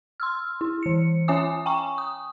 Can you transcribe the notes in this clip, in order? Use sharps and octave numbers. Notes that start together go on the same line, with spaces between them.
C6 E6 F6
E4
E3 C#7
C#4 C#5 E5 G#5 D6 D#6
G5 G#5 A#5 C#6
D#6